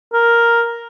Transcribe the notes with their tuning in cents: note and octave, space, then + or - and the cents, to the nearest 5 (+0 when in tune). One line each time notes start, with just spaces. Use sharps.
A#4 +5